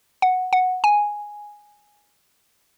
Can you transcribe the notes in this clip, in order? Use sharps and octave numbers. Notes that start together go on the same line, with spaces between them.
F#5
F#5
G#5